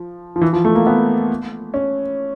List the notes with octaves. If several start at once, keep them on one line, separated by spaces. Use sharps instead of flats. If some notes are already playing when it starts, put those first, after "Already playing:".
Already playing: F3
F3
E3
F3
A3
A#3
B3
C#4